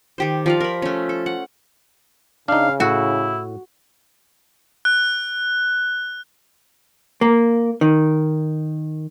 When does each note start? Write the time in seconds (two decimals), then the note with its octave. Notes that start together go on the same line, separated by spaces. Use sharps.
0.18 D#3 G4 C5
0.46 F3 D5 F5
0.61 A#4 B5
0.82 A3 C#4
1.09 A4
1.26 F#5
2.48 C#3 D4 D#4 F5
2.80 A2 E4 F#4
4.85 F#6
7.21 A#3
7.81 D#3